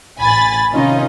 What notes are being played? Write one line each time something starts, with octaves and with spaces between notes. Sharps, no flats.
A1 G#5 B5 A6
C3 D#3 C#4 D#4 F4 D#5